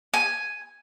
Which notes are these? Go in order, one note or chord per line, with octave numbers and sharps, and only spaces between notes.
G#5